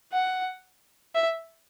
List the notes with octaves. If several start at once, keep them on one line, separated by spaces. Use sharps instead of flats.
F#5
E5